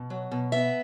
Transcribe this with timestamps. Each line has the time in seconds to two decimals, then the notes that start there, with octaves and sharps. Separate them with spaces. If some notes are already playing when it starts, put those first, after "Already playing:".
Already playing: B2
0.10 F#3
0.32 B2
0.52 B3 E5